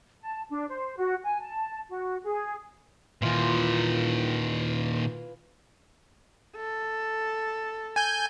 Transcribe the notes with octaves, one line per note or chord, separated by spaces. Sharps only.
A5
D4
C5
F#4
G#5
A5
F#4
G#4
A#2 D#3 E3 F4
A4
G#5 G6